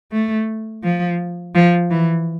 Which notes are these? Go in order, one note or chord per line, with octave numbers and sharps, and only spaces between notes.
A3
F3
F3
E3